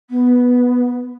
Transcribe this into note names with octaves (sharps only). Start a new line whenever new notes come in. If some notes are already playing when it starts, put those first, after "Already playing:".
B3